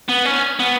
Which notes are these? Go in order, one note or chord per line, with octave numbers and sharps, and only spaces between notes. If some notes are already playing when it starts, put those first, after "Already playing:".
B3
C#4
B3